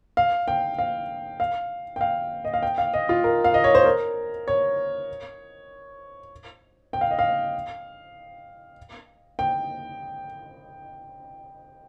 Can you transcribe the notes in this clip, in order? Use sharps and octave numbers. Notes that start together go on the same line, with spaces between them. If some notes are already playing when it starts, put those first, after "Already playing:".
F5
G5
F5
F5
G5
F5
D#5
F5
G5
F5
D#5
F4
A#4
F5
D#5
C#5
C5
A#4
C#5
G5
F5
D#5
F5
G5